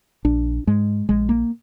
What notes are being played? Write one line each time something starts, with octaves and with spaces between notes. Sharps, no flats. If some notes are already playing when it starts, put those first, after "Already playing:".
A#1 D4
G#2 G#3
A#1 G#3
A#3